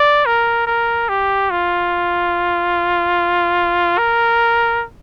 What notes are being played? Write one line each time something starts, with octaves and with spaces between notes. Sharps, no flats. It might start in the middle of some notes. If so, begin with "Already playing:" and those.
Already playing: D5
A#4
A#4
G4
F4
A#4